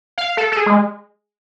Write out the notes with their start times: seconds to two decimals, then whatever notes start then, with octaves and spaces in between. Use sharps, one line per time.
0.18 F5
0.37 A4
0.52 A4
0.57 G#4
0.66 G#3